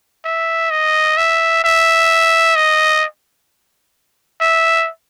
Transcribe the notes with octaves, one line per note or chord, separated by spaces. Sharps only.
E5
D#5
E5
E5
D#5
E5